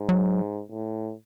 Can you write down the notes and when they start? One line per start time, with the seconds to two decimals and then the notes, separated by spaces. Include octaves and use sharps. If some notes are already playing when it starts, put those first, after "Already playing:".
Already playing: G#2
0.09 F#3
0.71 A2